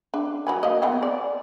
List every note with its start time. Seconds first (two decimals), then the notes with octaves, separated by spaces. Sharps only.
0.14 D4
0.47 F#3 B4 G#5
0.63 A#3 D#5
0.82 B3 C4 G#5
1.03 D5